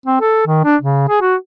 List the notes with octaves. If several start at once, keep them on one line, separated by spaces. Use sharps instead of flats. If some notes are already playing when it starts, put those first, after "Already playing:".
C4
A4
D#3
D4
C#3
G#4
F#4